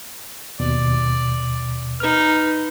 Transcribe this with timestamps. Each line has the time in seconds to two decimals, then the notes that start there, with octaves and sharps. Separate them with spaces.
0.60 D#2 B2 D5
2.00 D#4 B4 F6